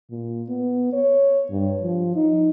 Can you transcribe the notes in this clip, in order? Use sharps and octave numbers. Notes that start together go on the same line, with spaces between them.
A#2
B3
C#5
G2
F3
D#4